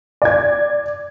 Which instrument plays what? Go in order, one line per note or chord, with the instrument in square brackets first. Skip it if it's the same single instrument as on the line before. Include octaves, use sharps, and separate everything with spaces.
[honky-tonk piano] D5 G#6